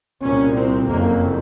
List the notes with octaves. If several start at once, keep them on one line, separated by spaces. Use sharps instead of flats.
C2 A#2 C#4
C4
F#1 F2 C3 A#3